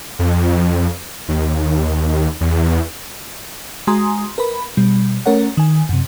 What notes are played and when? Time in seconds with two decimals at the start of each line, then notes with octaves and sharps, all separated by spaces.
0.19 F2
1.29 D#2
2.41 E2
3.87 G#3 F#4 G#5 A#5 C6 D#6
4.38 A#4 B4 B5
4.77 B2 G3
5.26 A3 C#4 A#4 C#5 F#5
5.57 D#3 G#5
5.89 F#2 C3